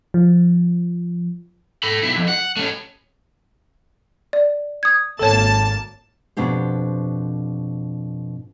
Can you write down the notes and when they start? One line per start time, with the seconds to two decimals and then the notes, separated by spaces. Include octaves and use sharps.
0.14 F3
1.83 A4 B5
2.03 B1 E4
2.16 F2
2.28 F#5
2.57 A3 C#4
4.33 D5
4.83 D#6 G#6
5.19 G#1 A#3 A4 C#5 A5
6.37 F2 B2 D4 G4 C5